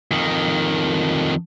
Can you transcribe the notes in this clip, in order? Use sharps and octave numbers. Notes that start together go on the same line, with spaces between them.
F2 D#3